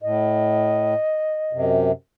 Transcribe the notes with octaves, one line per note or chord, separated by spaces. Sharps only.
A2 D#5
F#2 C3